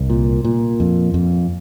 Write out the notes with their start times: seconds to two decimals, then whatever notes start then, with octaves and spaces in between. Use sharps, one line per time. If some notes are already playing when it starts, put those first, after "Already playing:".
Already playing: C2
0.10 A#2
0.44 A#2
0.80 F2
1.14 F2